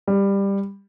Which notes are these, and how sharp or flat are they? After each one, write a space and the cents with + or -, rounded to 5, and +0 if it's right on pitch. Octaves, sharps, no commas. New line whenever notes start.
G3 +15